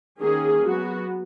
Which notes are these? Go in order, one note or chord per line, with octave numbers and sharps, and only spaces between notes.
D#3 A#3 C#4 G#4
F#3 B3 F#4